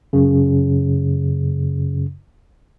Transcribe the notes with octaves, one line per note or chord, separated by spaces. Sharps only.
F#2 C#3